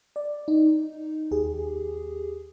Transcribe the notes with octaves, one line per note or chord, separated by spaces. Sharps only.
D5
D#4
D#2 G4 G#4